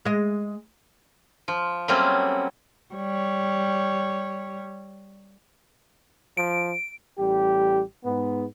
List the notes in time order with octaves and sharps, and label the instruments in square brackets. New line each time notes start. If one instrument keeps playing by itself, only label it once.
[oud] G#3 D#5
[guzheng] F3
F#3 G3 A3 A#3 C4 C#4
[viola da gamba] G3 C#5
[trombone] F3 [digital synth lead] D7
[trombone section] A1 G3 G4
G#2 B3